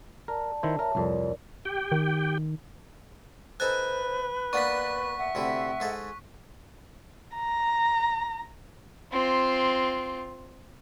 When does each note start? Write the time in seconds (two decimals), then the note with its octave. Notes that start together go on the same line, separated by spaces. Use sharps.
0.28 A#4 D5 A5
0.63 D#3 E4 C5
0.79 A#4 C#5 E5 A5
0.95 C2 F2 A#4 C#5 D5
1.65 G4 G5
1.92 D#3
3.60 D#4 A4 B4 C5 G#5 F#6
4.53 A#3 B3 D4 D5 C#6 B6
5.18 E5 F#5
5.35 D2 C3 E4
5.80 G#2 G#4 A4
7.36 A#5
9.12 C4 F4